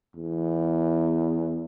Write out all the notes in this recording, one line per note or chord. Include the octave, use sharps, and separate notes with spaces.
E2